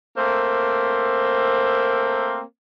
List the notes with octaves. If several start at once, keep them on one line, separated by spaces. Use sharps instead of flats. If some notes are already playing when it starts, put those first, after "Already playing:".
A3 A#3 C4 A#4 C5